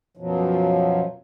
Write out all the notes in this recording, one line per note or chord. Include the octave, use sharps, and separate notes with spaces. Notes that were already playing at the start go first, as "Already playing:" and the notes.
F#2 B2 F3 F#3